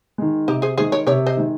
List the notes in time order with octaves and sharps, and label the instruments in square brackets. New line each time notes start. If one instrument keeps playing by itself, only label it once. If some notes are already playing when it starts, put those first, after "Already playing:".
[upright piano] D#3 G#3
[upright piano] C3 [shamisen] D#4 G4
[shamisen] G#4 C5
[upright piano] D#3 G#3 [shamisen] G#4 C5
[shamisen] A#4 C#5
[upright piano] C3 [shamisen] A#4 C#5
[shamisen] C5 D#5
[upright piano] D#3 G#3